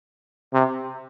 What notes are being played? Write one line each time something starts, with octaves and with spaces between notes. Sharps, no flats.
C3